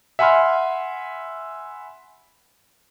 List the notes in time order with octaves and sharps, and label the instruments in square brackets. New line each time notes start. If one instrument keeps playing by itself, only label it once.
[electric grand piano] E5 F#5 G#5 B5 C6 F6